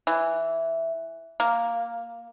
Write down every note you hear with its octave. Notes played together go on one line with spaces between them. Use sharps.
E3
A#3